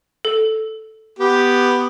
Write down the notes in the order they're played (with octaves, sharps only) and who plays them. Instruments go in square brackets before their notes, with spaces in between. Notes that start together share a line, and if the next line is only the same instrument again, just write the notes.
[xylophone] A4
[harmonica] B3 G4